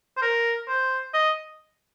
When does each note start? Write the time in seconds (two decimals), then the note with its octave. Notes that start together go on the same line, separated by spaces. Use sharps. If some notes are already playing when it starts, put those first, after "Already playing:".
0.17 C5
0.22 A#4
0.68 C5
1.14 D#5